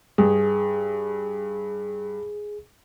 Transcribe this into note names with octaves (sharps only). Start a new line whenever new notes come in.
G2 G#4